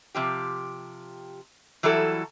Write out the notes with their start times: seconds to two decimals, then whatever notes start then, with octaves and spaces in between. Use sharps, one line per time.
0.15 C3 F3 G4
1.83 E3 F#3 G3 E4 A4